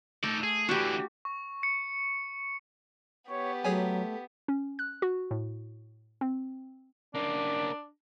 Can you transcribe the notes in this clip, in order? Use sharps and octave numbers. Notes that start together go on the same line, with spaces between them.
A3 D#4 D5
G#4
D3 E3 F#4 G4
C#6
C#7
B3 G4 C#5
F#3 A3 G#4 C#5 G#5
C#4
F#6
F#4
A2
C4
A#3 C#4 D4